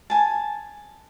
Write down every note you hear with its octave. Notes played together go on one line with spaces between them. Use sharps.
G#5 A5